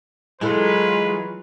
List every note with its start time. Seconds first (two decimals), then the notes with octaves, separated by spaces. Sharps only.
0.41 E3 F#3 G#3 E4 F4 A4 B4